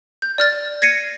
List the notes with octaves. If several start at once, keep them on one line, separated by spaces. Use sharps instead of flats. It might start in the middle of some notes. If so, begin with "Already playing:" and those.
G6
D5 F6 A6
G#6 A#6 C7 C#7 D#7